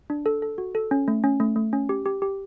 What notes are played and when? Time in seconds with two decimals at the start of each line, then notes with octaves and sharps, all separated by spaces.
0.10 D4
0.26 A4
0.42 A4
0.58 F#4
0.75 A4
0.91 C#4
1.08 A3
1.24 C#4
1.40 A3
1.56 A3
1.73 C#4
1.89 G4
2.06 G4
2.22 G4